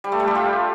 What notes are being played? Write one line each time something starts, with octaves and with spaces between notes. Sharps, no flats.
G3
A3
G3
G4
F4